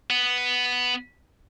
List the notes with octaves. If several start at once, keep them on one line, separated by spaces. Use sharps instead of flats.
B3